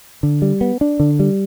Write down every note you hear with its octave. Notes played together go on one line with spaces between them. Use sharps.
D3
G3
B3
D4
D3
G3